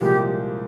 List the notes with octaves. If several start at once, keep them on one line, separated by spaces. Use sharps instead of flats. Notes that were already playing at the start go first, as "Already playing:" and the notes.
C2 A#2 F3 G#3 G4